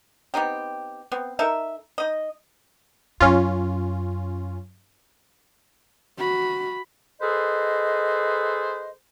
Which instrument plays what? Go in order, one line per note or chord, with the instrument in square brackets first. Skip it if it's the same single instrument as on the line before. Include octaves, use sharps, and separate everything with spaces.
[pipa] B3 C4 D#4 G4
B3 C4
D#4 A4 A#4 E5
D#4 D#5
[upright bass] F#2 [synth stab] C#4 F4
[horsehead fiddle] F#4 B5
[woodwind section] G#4 A4 B4 C5 D#5